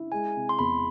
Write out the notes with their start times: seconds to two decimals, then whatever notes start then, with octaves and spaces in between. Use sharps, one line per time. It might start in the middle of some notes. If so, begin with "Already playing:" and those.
Already playing: E4
0.12 G#3 G#5
0.36 C3
0.49 C6
0.59 E2 B5